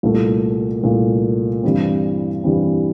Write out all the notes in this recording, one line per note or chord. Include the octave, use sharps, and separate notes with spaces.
C2 A#2 A3
C2 A#2 A3
G2 E3 G3 C4
G2 E3 G3 C4